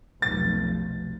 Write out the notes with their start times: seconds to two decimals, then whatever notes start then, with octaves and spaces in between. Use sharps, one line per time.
0.22 F1 B1 A6